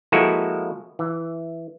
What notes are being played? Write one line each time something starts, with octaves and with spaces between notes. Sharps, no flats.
F3 G#3 A#3 E4 F#4 A4
E3